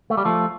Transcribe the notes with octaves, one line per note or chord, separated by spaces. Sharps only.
A3
G3
F3 A3